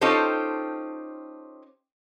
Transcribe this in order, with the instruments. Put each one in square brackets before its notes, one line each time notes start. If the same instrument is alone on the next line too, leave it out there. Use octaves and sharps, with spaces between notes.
[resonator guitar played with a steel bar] C#4 D#4 F4 G4 A4 C5